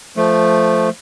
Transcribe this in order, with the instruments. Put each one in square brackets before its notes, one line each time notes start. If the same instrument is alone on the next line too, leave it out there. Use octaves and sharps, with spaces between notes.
[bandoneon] F3 A3